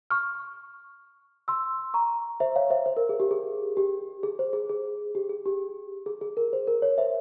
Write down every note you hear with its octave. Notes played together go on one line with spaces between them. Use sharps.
C#6 F6
C6 E6
A#5 C#6
C5 E5
C#5 F5
C5 E5
C5
A#4
G#4
G4
G#4
G4
G#4
C5
G#4
G#4
G4
G#4
G4
G#4
G#4
A#4
C5
A#4
C#5
C5 E5